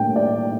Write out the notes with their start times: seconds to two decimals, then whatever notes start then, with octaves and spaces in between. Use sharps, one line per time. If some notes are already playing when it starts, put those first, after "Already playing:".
Already playing: A2 G3 A#3 D4 G5
0.16 D5